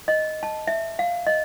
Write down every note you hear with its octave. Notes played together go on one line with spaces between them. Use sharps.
D#5
A5
E5
F5
D#5